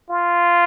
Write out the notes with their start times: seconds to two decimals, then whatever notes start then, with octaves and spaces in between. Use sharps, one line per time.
0.11 F4